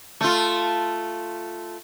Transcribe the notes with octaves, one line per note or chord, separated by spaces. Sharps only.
A3 F4